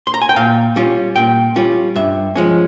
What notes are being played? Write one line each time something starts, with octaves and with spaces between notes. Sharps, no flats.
C6
A#5
G#5
G5
A#2 F5
G3 C#4 F4
A#2 G5
G3 C#4 F4
G2 E5
F3 G#3 C#4